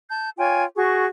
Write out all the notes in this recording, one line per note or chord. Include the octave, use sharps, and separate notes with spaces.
A5 G6
F4 C#5 G5 G#5
F#4 G#4 C#6